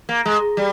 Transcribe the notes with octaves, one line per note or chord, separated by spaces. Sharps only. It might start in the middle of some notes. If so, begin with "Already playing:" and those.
A#3
G#3
G3